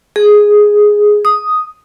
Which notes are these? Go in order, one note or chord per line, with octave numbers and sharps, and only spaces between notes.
G#4
D#6